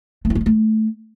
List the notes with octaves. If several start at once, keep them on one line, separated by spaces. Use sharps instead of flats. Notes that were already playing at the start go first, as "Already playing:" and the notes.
A3
E4
A#3
G#3
A3